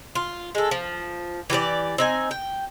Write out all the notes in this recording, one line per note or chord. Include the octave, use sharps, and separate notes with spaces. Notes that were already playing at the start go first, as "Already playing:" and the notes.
F4
G#3 A4
F3
E3 G4 G#4 D5
C4 D#4 G#5
G5